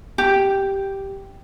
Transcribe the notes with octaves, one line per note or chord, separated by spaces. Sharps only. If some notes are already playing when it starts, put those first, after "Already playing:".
G4